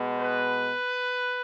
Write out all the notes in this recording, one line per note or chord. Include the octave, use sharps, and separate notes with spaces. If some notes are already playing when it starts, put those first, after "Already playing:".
Already playing: B2 G#3
B4